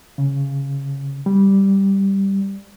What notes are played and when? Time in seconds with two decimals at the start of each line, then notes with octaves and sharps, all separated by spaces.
0.18 C#3
1.26 G3